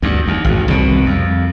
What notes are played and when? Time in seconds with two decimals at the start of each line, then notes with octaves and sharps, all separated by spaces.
0.02 D2 G2
0.28 D#2
0.45 G#1 D#2
0.68 C2 B2
1.06 F2